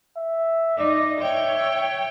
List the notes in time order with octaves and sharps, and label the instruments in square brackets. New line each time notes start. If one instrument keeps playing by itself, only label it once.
[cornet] E5
[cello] D#4 [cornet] D5
[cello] C#5 G5 [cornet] E5